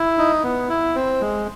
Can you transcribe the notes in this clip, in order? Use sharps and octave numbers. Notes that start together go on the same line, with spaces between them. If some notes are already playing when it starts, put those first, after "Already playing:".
Already playing: E4
D#4
B3
E4
C4
G#3